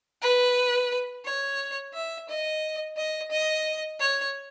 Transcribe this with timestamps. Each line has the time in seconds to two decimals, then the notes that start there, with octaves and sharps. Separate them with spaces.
0.22 B4
1.25 C#5
1.94 E5
2.29 D#5
2.97 D#5
3.31 D#5
4.00 C#5